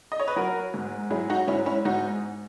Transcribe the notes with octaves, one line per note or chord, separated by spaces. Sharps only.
D#5
C#5
B4
F#3 F#4 A#4
G#2
F#3 E4 G#4
D#4 F#4
G#2 C#4 E4
C#4 E4
G#2 D#4 F#4